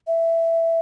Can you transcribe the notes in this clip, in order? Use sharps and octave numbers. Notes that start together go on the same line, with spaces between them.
E5